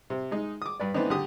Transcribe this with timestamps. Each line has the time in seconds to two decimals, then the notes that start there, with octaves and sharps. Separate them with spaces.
0.10 C3
0.31 G#3 D#4
0.62 D6 D#6
0.80 G2 B4 D5
0.94 E3 A3 B3 C4 D4 D#4
1.10 D3 G4 D#6